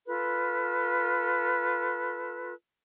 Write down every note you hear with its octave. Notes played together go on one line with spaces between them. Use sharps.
F4 A4 B4